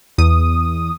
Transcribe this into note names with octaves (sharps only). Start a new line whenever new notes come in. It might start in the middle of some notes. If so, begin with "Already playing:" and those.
E2 D#6